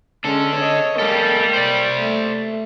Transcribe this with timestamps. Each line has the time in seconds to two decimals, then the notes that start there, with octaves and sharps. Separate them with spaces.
0.24 G#3 C#4 D4 A4
0.55 C#5 D#5
0.99 G3 G#3 A#3 A4
1.54 C5 D5
1.98 A3